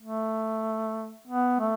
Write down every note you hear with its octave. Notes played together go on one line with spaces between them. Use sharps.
A3
B3
A3